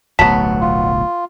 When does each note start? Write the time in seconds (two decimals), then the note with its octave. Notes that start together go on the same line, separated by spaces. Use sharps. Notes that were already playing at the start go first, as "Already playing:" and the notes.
0.19 D1 B1 F#3 A3 B3 A5 B6
0.61 F4